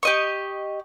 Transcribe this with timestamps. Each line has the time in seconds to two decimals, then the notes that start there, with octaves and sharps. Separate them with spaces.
0.03 G4 D#5 C#6